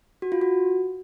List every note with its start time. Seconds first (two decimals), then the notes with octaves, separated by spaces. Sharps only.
0.22 F#4
0.32 F4
0.41 F#4